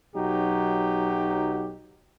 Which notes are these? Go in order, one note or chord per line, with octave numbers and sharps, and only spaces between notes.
B1 F#3 D#4 G4